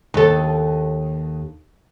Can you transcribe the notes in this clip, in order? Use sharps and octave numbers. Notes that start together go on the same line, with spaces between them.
D#2 A4